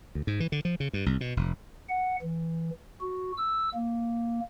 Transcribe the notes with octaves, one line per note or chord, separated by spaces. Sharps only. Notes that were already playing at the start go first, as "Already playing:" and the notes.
D2
G#2
E3
D3
F3
C#3
G2
C2
B2
F1
F#5
E3
F#4
E6
A#3